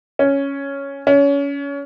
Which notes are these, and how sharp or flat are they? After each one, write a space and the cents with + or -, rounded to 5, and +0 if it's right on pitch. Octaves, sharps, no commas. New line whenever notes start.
C#4 +0
C#4 +25